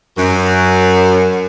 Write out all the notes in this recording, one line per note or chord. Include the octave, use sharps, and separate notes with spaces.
F#2